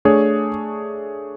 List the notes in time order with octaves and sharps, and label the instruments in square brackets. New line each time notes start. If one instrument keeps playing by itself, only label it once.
[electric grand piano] A3 D4 G#4 C#5